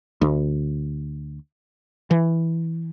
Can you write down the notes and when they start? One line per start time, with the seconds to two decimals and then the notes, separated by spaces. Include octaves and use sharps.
0.22 D2
2.11 E3